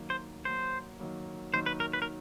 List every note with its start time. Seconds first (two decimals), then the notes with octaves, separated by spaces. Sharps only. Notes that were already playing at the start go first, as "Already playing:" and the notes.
Already playing: D#3 F#3 A#3
0.10 C5
0.45 D#3 F#3 A#3 C5
1.00 D#3 F#3 A#3
1.54 D#3 F#3 A#3 C5
1.66 B4
1.80 A#4
1.93 B4
2.02 A#4